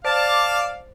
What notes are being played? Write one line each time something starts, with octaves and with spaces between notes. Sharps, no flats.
C5 D5 F5 A5